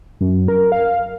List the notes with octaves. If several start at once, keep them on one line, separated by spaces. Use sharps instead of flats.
F#2
A#4
F5